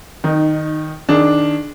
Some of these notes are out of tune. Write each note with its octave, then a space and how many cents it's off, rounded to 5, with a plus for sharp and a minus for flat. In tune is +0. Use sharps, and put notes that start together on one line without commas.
D#3 +0 D#4 -20
D#3 +0 D4 +0 G#4 +25